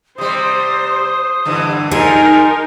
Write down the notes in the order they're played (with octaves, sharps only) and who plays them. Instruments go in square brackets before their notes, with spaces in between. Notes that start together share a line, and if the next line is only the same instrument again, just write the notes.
[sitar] C3 G3 [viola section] C5 [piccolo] D#6
[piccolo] D#6
[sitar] G2 D3 E3
[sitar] F3 [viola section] D#4 A#4 [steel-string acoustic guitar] G#4 [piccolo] C6